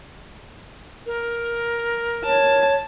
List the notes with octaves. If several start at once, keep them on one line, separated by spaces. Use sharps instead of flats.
A#4
C#5 A5